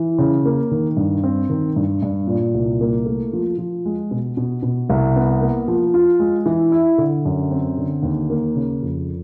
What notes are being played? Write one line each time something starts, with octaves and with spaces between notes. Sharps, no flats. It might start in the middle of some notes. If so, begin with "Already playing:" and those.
Already playing: E3
C#3
A#3
D#3
G2
C4
D#3
G2
G2
A#2
C2
A#3
A3
F3
F3
G#3
B2
B2
B2
C2
B3
A#3
F3
F4
G#3
E3
E4
D3
F#2
C4
D3
D#2
A#3
C#3
F2